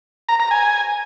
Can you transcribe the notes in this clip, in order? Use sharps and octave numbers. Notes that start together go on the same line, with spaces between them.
A#5
A#5
G#5